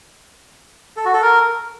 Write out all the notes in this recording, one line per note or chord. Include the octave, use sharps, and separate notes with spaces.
A4
F#4
A4
A#4